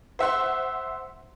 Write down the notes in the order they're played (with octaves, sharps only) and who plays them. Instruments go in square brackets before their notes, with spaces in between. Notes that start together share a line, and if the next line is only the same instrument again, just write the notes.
[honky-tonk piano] C5 E5 F#5 C6